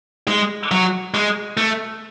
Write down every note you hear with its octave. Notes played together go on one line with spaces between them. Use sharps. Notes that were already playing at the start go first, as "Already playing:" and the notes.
G#3
F#3
G#3
A3